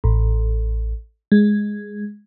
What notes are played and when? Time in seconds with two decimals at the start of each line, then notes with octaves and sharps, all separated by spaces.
0.04 A1
1.32 G#3